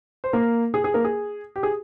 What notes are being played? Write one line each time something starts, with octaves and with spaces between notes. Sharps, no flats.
C5
A#3 A#4
G#4
G#4
A#3 A#4
G#4
G4
G#4